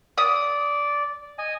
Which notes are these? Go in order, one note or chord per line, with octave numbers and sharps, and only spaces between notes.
D5 D#6
D#5 G#5